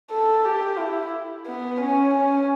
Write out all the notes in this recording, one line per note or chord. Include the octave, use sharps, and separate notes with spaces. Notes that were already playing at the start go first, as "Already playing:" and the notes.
A4
G4
E4
B3
C#4
C#4